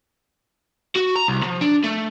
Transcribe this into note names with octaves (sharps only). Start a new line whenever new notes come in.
F#4
A#5
C2
F3
D4
A3